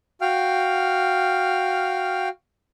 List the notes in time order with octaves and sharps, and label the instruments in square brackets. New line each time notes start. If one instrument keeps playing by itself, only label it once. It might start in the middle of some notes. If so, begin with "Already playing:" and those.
[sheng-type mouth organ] F#4 F5 G5 F6